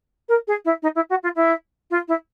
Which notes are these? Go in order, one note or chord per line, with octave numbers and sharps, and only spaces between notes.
A#4
G#4
E4
D#4
E4
F#4
F4
E4
F4
E4